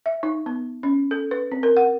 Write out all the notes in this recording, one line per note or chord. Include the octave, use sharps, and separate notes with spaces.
E5
D#4
B3
C#4
A4
B4
C4
A#4
F#5